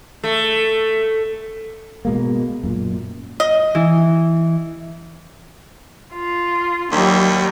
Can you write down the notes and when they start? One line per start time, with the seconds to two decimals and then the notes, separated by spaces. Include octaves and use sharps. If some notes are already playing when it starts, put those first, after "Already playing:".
0.24 A3
2.05 B2 G#3 A#3
2.63 F#2 A#2
3.40 D#5
3.75 E3
6.13 F4
6.92 D#2 F#3 G3